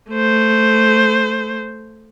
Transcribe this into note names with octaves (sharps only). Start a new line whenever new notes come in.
A3 C5